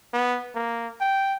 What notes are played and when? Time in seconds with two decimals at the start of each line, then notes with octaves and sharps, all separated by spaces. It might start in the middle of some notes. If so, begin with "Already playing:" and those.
0.13 B3
0.55 A#3
1.00 G5